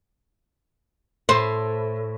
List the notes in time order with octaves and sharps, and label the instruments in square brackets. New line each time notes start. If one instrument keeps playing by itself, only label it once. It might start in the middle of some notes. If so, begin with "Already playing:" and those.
[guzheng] A2 [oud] C5